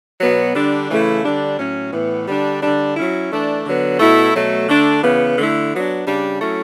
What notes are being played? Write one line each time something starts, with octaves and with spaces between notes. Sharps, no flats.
B2 F#3 B3
D3 G3 D4
C#3 E3 A3 E4
D3 G3 D4
A2 F#3 C#4
A2 E3 B3
D3 G3 D4
D3 G3 D4
F#3 C#4 E4
E3 A3 D4
D3 F#3 B3
B2 A3 E4
B2 F#3 A3
D3 A3 D4
C#3 E3 B3
D3 A3 E4
F#3 B3 D4
C#3 G3 D4
F#3 A3 C#4 E4